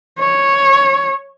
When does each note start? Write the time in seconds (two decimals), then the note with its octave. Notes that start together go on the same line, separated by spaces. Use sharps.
0.20 C#5